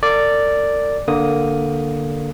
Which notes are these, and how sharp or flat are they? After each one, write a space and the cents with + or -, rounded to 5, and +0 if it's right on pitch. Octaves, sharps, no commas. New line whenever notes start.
A#4 -45 D5 +0
D3 +0 A#3 +0 D#6 +0